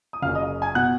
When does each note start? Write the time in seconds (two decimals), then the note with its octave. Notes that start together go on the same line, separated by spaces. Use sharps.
0.13 D#6
0.22 F#1 F#2 C#3 F5 F6
0.35 D#5 D#6
0.62 G#5 G#6
0.75 B2 F#5 F#6